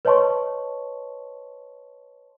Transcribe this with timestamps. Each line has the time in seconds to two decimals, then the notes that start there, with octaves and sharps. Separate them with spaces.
0.05 B4 C#5 D#5 A5 C6 C#6